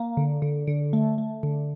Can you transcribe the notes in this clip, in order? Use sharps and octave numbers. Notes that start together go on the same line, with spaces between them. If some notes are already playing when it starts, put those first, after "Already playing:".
Already playing: A#3
D3
D3
D3
A3
A3
D3